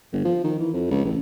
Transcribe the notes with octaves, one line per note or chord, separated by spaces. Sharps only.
G1
F3
D#3
E3
F2
C#2
A1